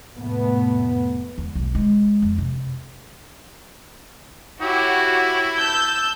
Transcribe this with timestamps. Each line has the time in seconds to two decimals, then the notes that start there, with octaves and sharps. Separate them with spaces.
0.15 F1 A2 A3 B3
1.38 E2
1.55 B1
1.75 G#3
2.22 F2
2.38 C3
4.61 E4 F#4 G4 C#5
5.56 A5 E6 G6